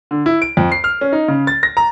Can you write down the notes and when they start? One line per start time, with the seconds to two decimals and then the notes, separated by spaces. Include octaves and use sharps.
0.11 D3
0.26 E4
0.42 D7
0.57 F2
0.72 C7
0.84 F6
1.01 C#4
1.12 D#4
1.28 C#3
1.47 A6
1.63 A#6
1.77 A#5